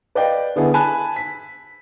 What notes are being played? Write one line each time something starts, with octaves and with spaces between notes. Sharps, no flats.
B4 D5 D#5 F5 G5
D3 B3 E4 G#4 A4
G#5 A5 B5 F#6
B6